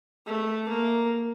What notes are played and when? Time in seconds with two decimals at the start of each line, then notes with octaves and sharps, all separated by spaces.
0.26 A3
0.69 A#3